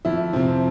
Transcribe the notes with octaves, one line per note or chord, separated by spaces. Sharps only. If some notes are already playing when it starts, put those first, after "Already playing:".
F2 E4
C3 F3 C4